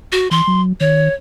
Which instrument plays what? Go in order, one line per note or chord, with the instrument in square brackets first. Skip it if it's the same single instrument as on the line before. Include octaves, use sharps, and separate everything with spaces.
[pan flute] F#4
[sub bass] E3 [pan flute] C6
[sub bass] F#3
[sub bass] D#3 [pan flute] C#5